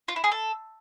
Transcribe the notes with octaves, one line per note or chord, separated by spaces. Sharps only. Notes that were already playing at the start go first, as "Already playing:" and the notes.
F4
E4
G#4
A4